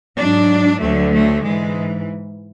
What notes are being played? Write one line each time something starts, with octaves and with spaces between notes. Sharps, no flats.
G#2 F#3 D4
D2 D3 F#3 A3
A3
G#2 E3 G#3